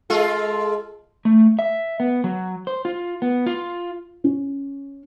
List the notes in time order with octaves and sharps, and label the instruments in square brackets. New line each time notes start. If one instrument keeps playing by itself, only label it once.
[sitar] G#3 F4 A4
[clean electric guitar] A3
E5
B3
F#3
C5
F4
B3
F4
[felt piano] C#4